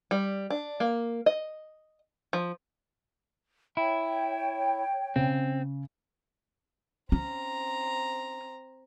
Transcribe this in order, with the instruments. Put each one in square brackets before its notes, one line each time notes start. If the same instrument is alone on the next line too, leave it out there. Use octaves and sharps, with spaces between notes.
[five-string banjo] G3
D4
A#3
D#5
F3
[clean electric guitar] E4 [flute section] C#5 G5
[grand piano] C#3 [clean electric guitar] C4
[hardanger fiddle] C4 A#5 [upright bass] C#4